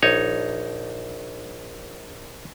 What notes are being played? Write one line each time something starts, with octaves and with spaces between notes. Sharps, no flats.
A#1 D#4 C#5